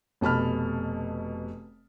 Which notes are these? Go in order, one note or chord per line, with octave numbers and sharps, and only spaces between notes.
F1 B2 A5 B5 F6